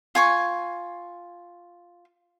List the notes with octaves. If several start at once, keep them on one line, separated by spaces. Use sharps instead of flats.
F4 G#5 C#6